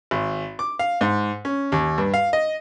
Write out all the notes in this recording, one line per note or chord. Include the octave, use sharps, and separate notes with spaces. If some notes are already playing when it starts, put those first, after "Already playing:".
G#1
D6
F5
G#2
C#4
D#2
G2
F5
D#5